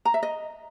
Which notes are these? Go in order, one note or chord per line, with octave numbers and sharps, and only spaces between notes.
A#5
E5
D#5